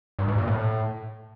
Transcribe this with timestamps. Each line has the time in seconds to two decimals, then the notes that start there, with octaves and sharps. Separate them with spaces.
0.19 G2
0.28 G#2
0.38 A#2
0.48 A2